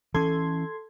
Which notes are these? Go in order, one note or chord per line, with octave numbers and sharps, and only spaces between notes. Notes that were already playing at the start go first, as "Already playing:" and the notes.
E3 C#4 A4 C6 G#6